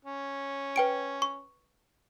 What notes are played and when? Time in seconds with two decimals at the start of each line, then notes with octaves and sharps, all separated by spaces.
0.05 C#4
0.76 B4 G5 D7
1.22 C#6